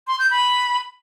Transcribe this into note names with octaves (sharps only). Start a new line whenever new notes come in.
C6
G6
B5